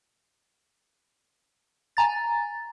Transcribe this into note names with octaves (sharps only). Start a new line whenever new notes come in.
G#5 A#5 A6